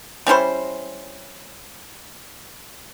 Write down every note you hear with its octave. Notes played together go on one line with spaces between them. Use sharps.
G3 C#4 E4 C5